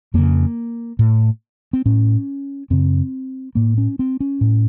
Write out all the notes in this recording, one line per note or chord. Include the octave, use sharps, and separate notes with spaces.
F2 C#3 A#3
A2
C4
A2 C#4
F#2 C#3 C4
A2 A#3
C#4
C4
C#4
A2